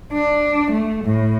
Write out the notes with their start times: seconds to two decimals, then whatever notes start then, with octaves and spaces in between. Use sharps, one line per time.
0.13 D4
0.72 A3
1.05 A2